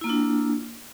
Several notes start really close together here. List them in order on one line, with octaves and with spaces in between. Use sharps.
E4 A#3 F4 D4